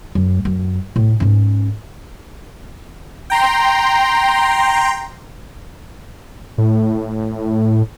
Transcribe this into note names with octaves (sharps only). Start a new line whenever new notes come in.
F#2
F#2
A2
G#2 C#4
G5 A#5 C6
A2